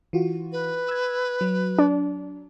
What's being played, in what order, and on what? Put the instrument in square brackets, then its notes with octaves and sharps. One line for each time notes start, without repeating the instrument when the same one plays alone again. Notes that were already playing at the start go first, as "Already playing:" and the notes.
[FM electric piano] E3 F4 F#4
[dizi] B4
[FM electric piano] E6 G#6
F#3
[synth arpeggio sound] D4